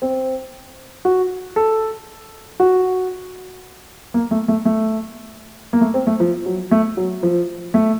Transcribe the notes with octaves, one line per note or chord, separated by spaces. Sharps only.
C4
F#4
A4
F#4
A#3
A3
A3
A3
A#3
A3
C4
A3
F3
F#3
A3
F#3
F3
A3